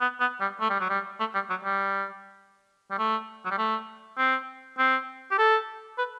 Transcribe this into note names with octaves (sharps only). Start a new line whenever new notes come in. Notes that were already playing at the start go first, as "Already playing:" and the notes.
B3
B3
G3
A3
G3
F#3
G3
A3
G3
F#3
G3
G3
A3
F#3
G3
A3
C4
C4
G4
A4
B4